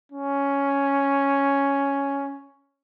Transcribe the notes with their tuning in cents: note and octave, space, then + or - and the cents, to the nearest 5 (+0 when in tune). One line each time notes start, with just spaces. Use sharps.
C#4 +5